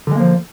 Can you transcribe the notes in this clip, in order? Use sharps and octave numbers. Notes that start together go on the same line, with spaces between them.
D3 F3 G#3 A#3